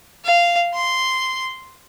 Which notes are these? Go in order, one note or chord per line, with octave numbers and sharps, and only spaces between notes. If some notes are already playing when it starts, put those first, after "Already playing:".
F5
C6